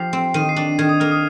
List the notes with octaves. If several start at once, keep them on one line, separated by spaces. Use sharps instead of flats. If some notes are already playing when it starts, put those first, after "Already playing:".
Already playing: F3 G4 C7
C4
D#3 D#7
C7
D4
D#3 G#6
D#6
A#3 F6
D#6